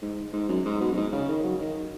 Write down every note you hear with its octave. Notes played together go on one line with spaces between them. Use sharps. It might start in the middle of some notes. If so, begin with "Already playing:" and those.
G#2
G#2
F#2
G#2
B2
F#2
G#2
C#3
D#3
F#3
D#3